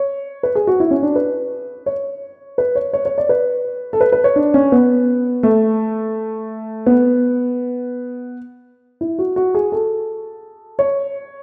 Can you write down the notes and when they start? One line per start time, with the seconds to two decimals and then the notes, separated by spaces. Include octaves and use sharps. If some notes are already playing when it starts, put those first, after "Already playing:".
Already playing: C#5
0.43 B4
0.55 G#4
0.67 F#4
0.80 E4
0.91 C#4
1.03 D4
1.16 B4
1.86 C#5
2.58 B4
2.75 C#5
2.93 C#5
3.05 C#5
3.18 D5
3.29 B4
3.93 A4
4.01 B4
4.12 B4
4.24 C#5
4.36 D4
4.54 C#4
4.72 B3
5.43 A3
6.86 B3
9.01 E4
9.19 F#4
9.36 F#4
9.54 G#4
9.72 A4
10.79 C#5